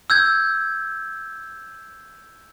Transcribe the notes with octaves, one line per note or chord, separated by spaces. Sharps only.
E6 G6 G#6